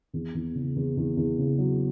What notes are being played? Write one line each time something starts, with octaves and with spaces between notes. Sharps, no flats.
E2
E2
C#3
E2
E2
E2
C#3
F#3